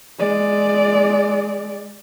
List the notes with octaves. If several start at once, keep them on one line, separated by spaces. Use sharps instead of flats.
G#3 D5